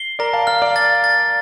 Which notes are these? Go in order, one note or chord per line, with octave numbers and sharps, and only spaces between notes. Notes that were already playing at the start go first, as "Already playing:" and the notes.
Already playing: C7 G7
A#4 D5 A#5
F5 A5
F5 A5 F6
D5 F5
A6
A6